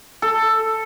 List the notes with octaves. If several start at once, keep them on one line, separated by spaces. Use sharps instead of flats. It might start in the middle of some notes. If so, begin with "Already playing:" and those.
A4